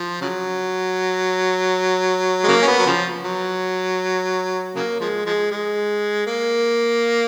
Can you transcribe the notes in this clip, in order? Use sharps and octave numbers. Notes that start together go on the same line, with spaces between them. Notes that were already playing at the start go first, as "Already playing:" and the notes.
Already playing: F3
C#3 F#3
G#3
C#3 F#3 A#3
C#4
B3
F#3
C#3 F3
F#3
C#3 F#3 A#3
F3 G#3
F3 G#3
G#3
A#3